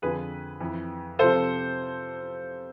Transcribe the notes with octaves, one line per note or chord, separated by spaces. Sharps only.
F2 D3 F3 G#4 B4
F2 E3
C3 F3 A4 C5